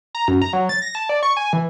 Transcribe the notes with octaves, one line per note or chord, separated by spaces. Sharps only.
A#5
F#2
A#5
F#3
A6
A#6
A5
D5
C#6
G#5
E3